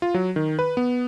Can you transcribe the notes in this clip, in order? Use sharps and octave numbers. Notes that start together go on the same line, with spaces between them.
F4
F#3
D#3
B4
B3